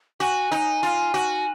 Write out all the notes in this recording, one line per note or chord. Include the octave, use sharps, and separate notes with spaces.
F#4 G#5
D#4
F4
F#4